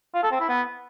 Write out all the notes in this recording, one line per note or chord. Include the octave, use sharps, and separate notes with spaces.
F4
A4
C4
E4
B3